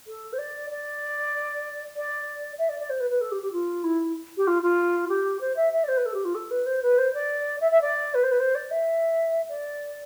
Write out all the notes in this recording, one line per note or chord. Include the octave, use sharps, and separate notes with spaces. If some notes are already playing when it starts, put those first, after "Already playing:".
A4
C5
D5
D5
D5
E5
D5
D5
C5
B4
B4
A4
G4
G4
F4
E4
G4
F4
F4
G4
C5
E5
E5
D5
C5
B4
A4
G4
F4
A4
B4
C5
B4
C5
D5
E5
E5
D5
B4
C5
B4
C5
D5
E5
D5